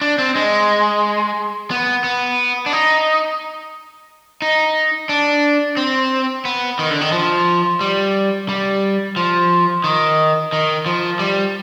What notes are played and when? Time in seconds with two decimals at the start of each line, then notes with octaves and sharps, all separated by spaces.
0.01 D4
0.18 C4
0.35 G#3
1.71 B3
2.04 B3
2.66 D4
2.73 D#4
4.42 D#4
5.09 D4
5.77 C4
6.45 B3
6.79 D#3
6.90 D3
7.01 D#3
7.13 F3
7.81 G3
8.49 G3
9.16 F3
9.84 D#3
10.53 D#3
10.86 F3
11.19 G3